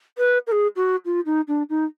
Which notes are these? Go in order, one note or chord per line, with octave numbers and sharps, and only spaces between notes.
B4
A#4
G#4
F#4
F4
D#4
D4
D#4